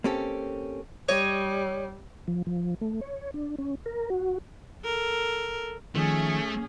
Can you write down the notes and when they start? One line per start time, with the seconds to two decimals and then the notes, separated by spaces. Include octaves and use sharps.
0.04 A#3 C4 C#4 G4 A4
1.08 G3 C#5 D#5
2.28 F3
2.47 F3
2.81 A3
3.01 C#5
3.34 D4
3.58 C#4
3.86 A#4
4.10 F#4
4.84 A4 A#4
5.95 D#3 F3 A3 C#4 G#4